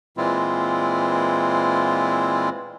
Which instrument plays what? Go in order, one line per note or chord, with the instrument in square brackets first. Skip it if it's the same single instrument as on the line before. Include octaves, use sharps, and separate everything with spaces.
[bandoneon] A#2 E3 G#3 C4 E4 F4